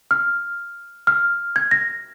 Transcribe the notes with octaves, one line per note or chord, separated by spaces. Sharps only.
F6
F6
G#6
A#6